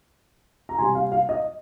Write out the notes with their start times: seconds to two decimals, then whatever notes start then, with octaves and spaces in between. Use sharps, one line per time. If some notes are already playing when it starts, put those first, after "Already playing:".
0.69 A#5
0.78 C3 G3 A#3 G#5 C6
0.95 F5
1.12 F5
1.29 D#5